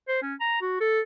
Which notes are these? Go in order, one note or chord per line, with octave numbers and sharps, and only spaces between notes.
C5
C#4
A#5
F#4
A4